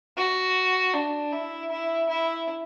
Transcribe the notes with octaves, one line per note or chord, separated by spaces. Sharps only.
F#4
D4
E4
E4
E4